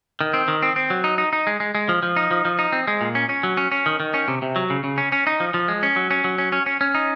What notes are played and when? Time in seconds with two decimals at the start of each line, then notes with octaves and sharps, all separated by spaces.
0.21 D#3
0.34 C4
0.48 D#3
0.62 C4
0.76 C4
0.90 F#3
1.04 D#4
1.18 D#4
1.33 D#4
1.47 G#3
1.60 G#3
1.75 G#3
1.89 F3
2.03 F3
2.16 D#4
2.31 F3
2.45 F3
2.59 D#4
2.72 C4
2.88 G#3
3.01 A#2
3.15 C#4
3.29 C#4
3.43 F#3
3.57 C#4
3.72 C#4
3.86 D#3
4.00 D#3
4.14 C#4
4.28 C3
4.42 C3
4.56 F#3
4.70 C#3
4.84 C#3
4.98 C#4
5.12 C#4
5.27 D#4
5.40 F3
5.54 F3
5.68 G#3
5.83 C#4
5.96 F#3
6.11 C#4
6.24 F#3
6.38 C#4
6.52 C#4
6.66 C#4
6.81 C#4
6.95 D#4